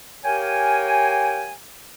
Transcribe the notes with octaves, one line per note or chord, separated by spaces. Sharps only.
G4 A#4 C#5 F5 G5 G#5